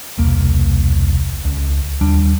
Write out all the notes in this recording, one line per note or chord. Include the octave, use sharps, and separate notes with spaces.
E1 C2 A#3
C#2
D#2 G3 D4